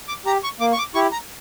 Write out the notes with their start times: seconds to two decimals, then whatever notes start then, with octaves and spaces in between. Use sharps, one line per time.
0.08 D6
0.25 G4 A#5
0.44 C#6
0.60 A#3 D6
0.72 C#6
0.78 D6
0.95 E4 G4 C#6
1.12 A#5